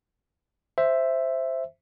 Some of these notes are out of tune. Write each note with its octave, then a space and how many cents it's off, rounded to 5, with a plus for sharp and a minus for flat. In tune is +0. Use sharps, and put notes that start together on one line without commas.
C5 +0 E5 +5